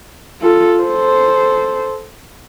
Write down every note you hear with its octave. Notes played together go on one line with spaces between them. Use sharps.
F4 A4
A4 C5